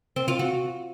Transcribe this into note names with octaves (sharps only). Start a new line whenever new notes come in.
C4
F4
F#4